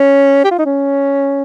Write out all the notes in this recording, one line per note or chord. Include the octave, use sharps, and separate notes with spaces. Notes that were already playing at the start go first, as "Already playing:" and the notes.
Already playing: C#4
G4
F4
D#4
C#4